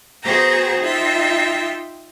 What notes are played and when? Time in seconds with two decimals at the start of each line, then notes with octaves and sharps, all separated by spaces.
0.23 B3 F#4 G#4 C5 G5 A#5
0.81 D#4 F4 E5 G5